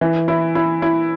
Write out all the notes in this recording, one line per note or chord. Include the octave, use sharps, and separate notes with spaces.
E3
E4
E4
E4